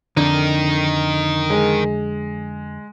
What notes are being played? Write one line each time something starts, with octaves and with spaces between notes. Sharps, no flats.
F2 D3 D#3 D#4
G#3